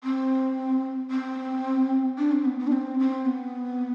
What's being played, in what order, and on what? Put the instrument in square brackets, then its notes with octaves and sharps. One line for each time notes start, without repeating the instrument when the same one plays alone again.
[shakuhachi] C4
C4
D4
C4
B3
B3
D4
C4
C4
B3